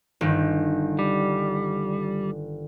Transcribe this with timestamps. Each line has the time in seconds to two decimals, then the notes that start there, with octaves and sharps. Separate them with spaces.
0.21 G1 D#3
0.99 G3